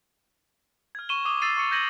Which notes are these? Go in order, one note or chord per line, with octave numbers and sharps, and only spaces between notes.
F6 G#6
C#6 D#7 E7 G7
D6 D#6 D#7 G7
E6 A6 C7 D#7
C#6 C#7 D#7
G6 G#6 A#6 D#7 F#7